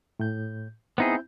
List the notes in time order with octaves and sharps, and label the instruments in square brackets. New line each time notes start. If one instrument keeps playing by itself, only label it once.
[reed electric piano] A2 G6
[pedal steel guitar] B3 D#4 G#4 [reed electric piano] C4 E4 G6